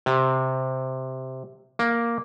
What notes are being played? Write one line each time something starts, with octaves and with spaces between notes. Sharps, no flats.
C3
A#3